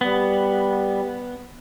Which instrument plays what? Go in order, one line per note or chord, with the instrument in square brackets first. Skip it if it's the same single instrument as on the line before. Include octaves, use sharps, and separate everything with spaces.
[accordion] G3 [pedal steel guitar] B3